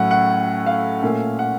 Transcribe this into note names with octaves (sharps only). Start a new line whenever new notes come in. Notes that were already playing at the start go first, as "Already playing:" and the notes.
Already playing: A2 F#3 A3 C#4 F#5
F#5
F5
A#2 A3 C#4
F#5